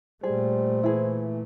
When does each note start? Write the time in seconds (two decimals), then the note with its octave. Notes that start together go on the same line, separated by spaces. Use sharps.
0.23 A#2 G3 A3 G#4 C5
0.83 E3 E4 G#4